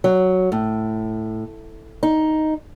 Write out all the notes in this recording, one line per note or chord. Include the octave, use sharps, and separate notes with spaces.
F#3
A2
D#4